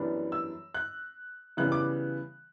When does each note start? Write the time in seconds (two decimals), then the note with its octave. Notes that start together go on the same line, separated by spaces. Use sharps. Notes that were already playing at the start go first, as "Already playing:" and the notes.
Already playing: F#2 E3 G3 B3 D4
0.32 E6
0.74 F#6
1.57 C#3 E3 G3 B3 F#6
1.72 D6